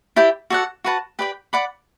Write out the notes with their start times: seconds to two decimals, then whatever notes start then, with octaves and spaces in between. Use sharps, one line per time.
0.16 E4 G4 D5 G5
0.50 F#4 A4 D5 F#5
0.84 F#4 B4 F#5 A5
1.19 G4 B4 D5 G5
1.53 D5 F#5 B5 D6